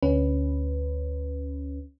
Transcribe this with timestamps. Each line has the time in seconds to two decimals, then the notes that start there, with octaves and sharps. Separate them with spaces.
0.03 D2 C#4 B4